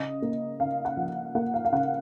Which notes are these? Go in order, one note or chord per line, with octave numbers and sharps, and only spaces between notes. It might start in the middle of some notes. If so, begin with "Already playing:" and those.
Already playing: C#3 D#5
A#3
C#3 F5
F#5
F3
A#3 F#5
F5
F5
C#3 F#5